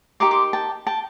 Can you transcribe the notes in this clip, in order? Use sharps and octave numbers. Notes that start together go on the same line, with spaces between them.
D#4 G4 A#4 C6 D6
C6 D6
G5 A5
G5 A5